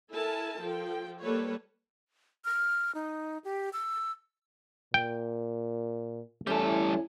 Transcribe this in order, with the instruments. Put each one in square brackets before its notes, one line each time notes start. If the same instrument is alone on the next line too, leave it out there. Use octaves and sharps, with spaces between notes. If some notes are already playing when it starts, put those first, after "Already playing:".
[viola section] E4 A4 A#4 G#5 A5
F3 A4 G5
G3 A#3 A4 B4 C#5
[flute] F6
D#4
G4
E6
[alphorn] A#2 [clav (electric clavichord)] G5
[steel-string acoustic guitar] E2 C#4 [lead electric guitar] G3 A4 [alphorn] A3